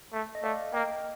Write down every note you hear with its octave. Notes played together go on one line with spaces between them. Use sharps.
A3
D#5
A3 D5 F5
A#3 D#5 G5